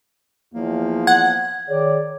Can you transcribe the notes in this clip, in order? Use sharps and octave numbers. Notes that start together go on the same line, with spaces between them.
E2 F3 A#3
F#5 G#6
D#3 G#4 C#5 D5